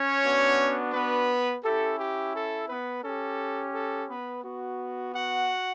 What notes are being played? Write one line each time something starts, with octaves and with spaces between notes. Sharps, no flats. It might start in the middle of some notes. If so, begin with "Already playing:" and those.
Already playing: C#4 C#5
B3 D4 F#4
B3 B4
C#4 E4 G4 A4
G4
A4
B3 B4
C#4 G4 A4
A4
B3 B4
B3 F#4
F#4 F#5